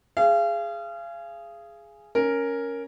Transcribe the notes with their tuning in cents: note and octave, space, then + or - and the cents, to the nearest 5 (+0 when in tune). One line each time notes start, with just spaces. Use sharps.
G#4 +0 F5 -35
C#4 +0 A#4 +0